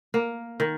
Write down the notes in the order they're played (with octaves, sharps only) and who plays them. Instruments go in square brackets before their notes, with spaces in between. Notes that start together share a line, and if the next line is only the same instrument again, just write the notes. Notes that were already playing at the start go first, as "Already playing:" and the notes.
[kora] A#3
D#3